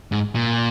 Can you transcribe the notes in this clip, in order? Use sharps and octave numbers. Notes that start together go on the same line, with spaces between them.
G#2
A#2